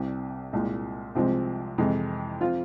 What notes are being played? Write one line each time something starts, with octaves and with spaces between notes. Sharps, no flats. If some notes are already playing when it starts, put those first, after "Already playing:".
Already playing: C2 C3 G3
C2 A#2 G#3
C2 C3 F3 G#3 C4
F2 C3 E3 G#3
F3 C4 F4